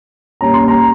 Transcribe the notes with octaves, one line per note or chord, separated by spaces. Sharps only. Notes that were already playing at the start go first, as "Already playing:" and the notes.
A#2 G3 C#4 A#5
C6
A#5